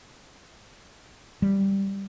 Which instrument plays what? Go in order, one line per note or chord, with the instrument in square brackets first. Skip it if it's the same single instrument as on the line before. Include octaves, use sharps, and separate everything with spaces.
[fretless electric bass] G3